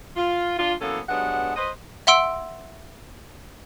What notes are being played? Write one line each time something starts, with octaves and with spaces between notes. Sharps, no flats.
F4
D4 F4
E3 F#3 A#3 B3 C#4 A4
G2 F#3 G#3 B3 D4 F#5
B4 C5 D#5
E5 F#5 C6 E6 D7